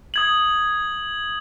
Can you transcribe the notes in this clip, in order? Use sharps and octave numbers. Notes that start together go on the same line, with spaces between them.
D#6 G#6 F#7